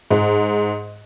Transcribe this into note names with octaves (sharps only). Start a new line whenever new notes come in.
G#2